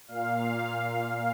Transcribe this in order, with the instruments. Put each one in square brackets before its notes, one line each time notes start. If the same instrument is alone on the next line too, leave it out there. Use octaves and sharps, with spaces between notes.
[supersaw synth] A#2 F5